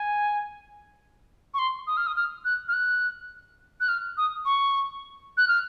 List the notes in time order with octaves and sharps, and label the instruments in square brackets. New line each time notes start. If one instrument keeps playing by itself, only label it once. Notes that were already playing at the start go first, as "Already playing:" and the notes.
Already playing: [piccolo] G#5
C#6
C6
D#6
F6
D#6
F6
F#6
F6
F#6
F#6
F6
D#6
C#6
F#6
F6